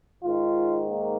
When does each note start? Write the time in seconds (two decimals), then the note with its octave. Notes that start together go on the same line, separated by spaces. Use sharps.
0.23 G#2 D#3 F4
0.87 A#3